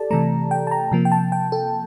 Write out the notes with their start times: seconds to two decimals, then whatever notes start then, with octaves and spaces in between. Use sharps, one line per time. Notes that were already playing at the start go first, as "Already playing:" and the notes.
Already playing: G4 A4 D5 A5
0.11 C3 E3 A3 A#5
0.51 G5
0.67 A5
0.71 A#5
0.91 C3 F3 A#3
1.05 G5
1.12 A5
1.32 G5
1.52 A4